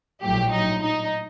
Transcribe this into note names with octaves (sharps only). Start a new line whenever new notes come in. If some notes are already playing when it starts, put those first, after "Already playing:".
A#1 A2 F#3 G4
D#4
D#4